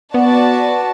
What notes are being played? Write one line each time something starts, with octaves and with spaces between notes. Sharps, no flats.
B3 F#4 B4 D5 A5